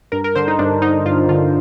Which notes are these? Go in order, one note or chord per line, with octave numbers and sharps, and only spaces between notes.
G2 A#4
A#4
D3 C5
D#4
G2 D4
D3 D#4
G2 F4
D3 F4